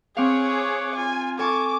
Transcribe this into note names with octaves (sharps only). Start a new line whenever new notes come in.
C4 G#4 C#5 F5 C#6 D6 F#6
F4 G#5
A4 G#5 C#6 D6